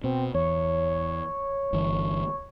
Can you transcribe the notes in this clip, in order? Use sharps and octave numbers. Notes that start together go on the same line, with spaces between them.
B2 C4
E2 C#5
G1 E3